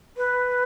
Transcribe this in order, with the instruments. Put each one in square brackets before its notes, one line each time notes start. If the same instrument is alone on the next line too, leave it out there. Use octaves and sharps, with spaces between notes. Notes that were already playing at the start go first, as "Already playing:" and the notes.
[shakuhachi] B4